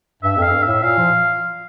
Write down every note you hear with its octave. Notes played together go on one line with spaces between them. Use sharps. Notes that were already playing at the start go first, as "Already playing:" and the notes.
G2 E5
F2 F5
G2
A2 E5
A#2 F5
F3